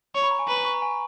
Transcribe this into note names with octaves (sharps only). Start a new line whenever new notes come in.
C#5 C#6
B5
A#5
G#5
B4 A#5
B5
C#6
A#5
G#5